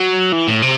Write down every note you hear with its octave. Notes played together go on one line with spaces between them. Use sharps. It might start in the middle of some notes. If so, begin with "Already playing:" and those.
Already playing: F#3
E3
A2
C3